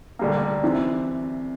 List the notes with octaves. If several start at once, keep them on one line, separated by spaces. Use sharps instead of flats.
D2 D3 G3 A#3
C3 E3